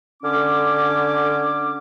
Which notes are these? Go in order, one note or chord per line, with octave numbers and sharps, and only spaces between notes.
D3 C#4 D6